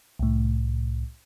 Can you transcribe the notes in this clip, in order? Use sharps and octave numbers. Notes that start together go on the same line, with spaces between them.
C2 A2